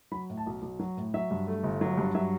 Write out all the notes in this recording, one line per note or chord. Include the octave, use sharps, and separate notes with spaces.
F#3 B5
A2
A5
B1
B1
F#3
A2
F#3 E5
G2
A3
G1
F#3
G2
F#3 E5